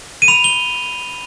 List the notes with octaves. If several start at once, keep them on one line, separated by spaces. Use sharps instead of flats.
D#7
B5 F7
G7